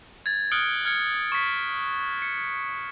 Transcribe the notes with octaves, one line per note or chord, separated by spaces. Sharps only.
G#6 A6
D#6 F6 F#6 C#7 D7 G7
F6 G#6 C#7
C#6 B6
C#7